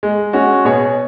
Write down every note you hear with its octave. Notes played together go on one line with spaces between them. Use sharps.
G#3
G#3 C#4 F#4
B2 G#4 C#5